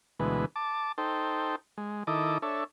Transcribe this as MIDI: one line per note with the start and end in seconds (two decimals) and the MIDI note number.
0.20 0.45 38
0.20 0.45 47
0.20 0.45 52
0.20 0.45 56
0.20 0.45 71
0.56 0.92 81
0.56 0.92 86
0.98 1.56 63
0.98 1.56 69
0.98 1.56 72
0.98 1.56 79
1.78 2.03 56
2.07 2.38 51
2.07 2.38 64
2.07 2.38 69
2.07 2.38 75
2.07 2.38 86
2.42 2.64 62
2.42 2.64 69
2.42 2.64 73
2.42 2.64 76